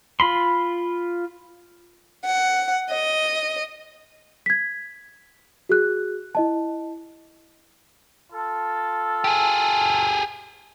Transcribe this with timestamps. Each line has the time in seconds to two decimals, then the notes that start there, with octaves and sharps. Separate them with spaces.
0.20 F4 B5 C6
2.24 F#5
2.89 D#5
4.46 G#6 B6
5.69 F#4 G#4 F#6
6.35 E4 D#5 A5
8.33 F4 A4
9.24 G4 G#4